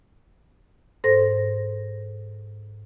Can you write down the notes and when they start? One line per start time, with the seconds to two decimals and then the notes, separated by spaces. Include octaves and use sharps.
1.04 G#2 A4 C5 A#6